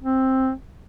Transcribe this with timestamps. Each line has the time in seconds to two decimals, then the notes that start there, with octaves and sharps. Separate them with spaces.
0.02 C4